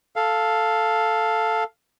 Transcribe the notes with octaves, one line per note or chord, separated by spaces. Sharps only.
A4 F5